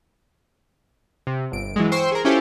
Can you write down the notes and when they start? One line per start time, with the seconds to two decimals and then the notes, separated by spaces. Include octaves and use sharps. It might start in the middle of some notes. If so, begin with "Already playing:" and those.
1.27 C3
1.52 G1 D7
1.76 E3 F#3 G#3
1.92 C5 G5 C6 C#6 E6
2.12 G#4 A#4
2.25 C#4 E4 F4 G4 A4 C5